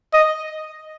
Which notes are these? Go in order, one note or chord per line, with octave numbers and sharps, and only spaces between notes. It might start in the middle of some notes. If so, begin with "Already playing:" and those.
D#5